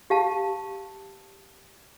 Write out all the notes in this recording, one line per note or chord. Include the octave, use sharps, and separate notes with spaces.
G4 F5 A5